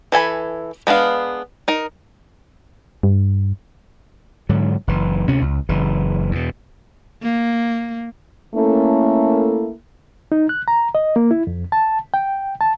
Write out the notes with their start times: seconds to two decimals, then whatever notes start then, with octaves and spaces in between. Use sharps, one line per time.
0.12 E3 A4 G#5 B5
0.87 G#3 B3 D4 F5
1.68 D#4 A#4
3.03 G2
4.49 G#2 D3 F#3
4.87 F#1 E3
5.27 D2 C3 C#4
5.41 C#2
5.69 F#1 C#3 E3
6.31 E2 B2
7.22 A#3
8.55 A3 A#3 C#4 E4 A4 A#4
10.32 D#4
10.49 F#6
10.68 A#5
10.95 D#5
11.16 A#3
11.31 E4
11.47 F2
11.72 A5
12.14 G5
12.61 A5